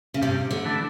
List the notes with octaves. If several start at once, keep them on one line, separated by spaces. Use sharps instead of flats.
C#3
G2 C3
D3
E3 A3 D4